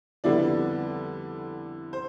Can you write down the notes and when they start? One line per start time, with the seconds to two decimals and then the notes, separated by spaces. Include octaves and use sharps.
0.24 F2 D3 G3 B3 E4 D5
1.93 C5